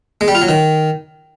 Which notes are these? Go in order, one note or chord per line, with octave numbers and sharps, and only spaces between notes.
G#3
G3
F4
F#3
D#3